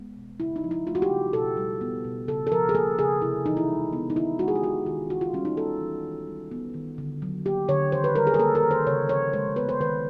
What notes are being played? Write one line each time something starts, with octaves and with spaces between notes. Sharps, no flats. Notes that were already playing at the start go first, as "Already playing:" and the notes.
Already playing: G#3 B3
B2
C#3 E4
D#4
F3
E4
A3 F4
F#4
G4
C#3
B2 A4
G3
B3
B2
C#3 A4
A4
F3 A#4
G#4
A#3 A4
C#3 G#4
C3 E4
E3 D#4
E4
G#3
B3
D#4
D#3 E4
G#3 F#4
G#4
G4
B3 F#4
D#3 F4
E3 F#4
F4
G3 C#4
D#4
B3 A4
E3
D#3
G3
B3
D#3
D3
F#3
A#3 G4
D3 C#5
D#3 C5
B4
G3 A#4
G#4
A#4
A#3 A4
A#4
D#3
C5
C#3 C#5
F3 C#5
G#3 C5
B3 B4
C5
D#3 B4